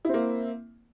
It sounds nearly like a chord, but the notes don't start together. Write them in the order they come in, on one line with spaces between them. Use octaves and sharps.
E4 C4 A#3